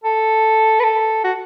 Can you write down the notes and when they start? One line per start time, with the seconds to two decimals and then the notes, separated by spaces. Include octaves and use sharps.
0.04 A4
0.80 B4
0.83 A4
1.24 F#4